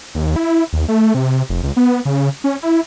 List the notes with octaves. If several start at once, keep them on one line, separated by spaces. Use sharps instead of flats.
D#2
E4
D#2
A3
C3
F1
C#2
B3
C#3
C#4
E4